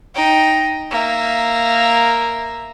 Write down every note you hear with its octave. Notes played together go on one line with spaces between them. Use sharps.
D#4 G5
A#3 E5